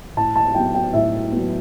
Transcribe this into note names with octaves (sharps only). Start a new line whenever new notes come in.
A2 A5
A5
F#3 B3 G5
G5
A2 E5
F#3 B3